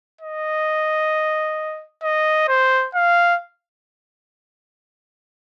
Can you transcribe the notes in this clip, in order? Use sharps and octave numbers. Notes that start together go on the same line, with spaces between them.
D#5
D#5
C5
F5